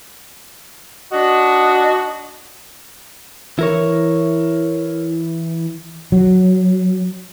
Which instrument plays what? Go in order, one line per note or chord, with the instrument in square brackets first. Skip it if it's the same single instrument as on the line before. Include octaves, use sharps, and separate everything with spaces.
[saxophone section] D4 D#4 F#4
[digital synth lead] E3 [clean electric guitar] E4 A#4 C#5
[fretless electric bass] F#3